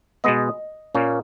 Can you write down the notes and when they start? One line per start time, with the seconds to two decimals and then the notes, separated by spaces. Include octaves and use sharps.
0.24 B2 G#3 B3 D#5
0.95 A#2 A#3 C#4